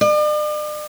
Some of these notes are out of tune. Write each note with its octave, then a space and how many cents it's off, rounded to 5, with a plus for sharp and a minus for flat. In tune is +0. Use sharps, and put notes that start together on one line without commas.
D5 +45